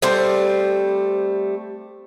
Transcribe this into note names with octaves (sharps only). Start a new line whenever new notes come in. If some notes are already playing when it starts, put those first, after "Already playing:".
G3 A3 C4